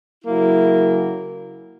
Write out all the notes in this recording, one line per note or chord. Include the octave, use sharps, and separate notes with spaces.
C#3 F#3 A#3 E4